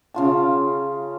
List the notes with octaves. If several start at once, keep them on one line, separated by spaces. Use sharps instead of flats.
C#3 F4 A5